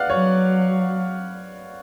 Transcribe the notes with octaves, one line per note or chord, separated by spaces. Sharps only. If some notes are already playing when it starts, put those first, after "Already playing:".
Already playing: B4 D5 F5 F#5
F#3 C#5